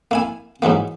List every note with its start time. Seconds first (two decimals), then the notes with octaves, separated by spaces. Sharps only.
0.11 A#3 E4 G#5
0.62 G#2 E3 F#3 A#3